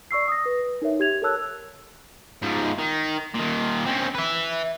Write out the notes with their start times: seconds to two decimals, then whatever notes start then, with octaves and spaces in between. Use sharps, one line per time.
0.11 D5 C#6 E6 C7
0.28 D#6 A#6
0.46 B4
0.82 D#4 A#4 C#5 E5
1.00 G4 G#6 F7
1.22 A4 A#4 C#5 A5 E6 F#6
2.42 G#2 F3
2.79 D#3
3.35 A#2 D#3
3.86 C4 C#4
4.15 B4 E5